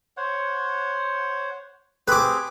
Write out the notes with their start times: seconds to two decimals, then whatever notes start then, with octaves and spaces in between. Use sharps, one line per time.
0.17 C5 C#5 F#5
2.08 C4 G4 G#4 B4 D6